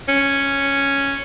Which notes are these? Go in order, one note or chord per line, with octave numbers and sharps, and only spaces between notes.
C#4